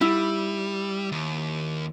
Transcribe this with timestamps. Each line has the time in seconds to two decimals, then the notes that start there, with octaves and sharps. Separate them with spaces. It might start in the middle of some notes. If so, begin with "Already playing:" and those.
0.01 G3 E4
1.12 D#2